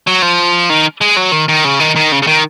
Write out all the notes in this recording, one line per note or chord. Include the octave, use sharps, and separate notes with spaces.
F#3
F3
D#3
G#3
F#3
D#3
D#3
C#3
D#3
D#3
C#3
C#3
D#3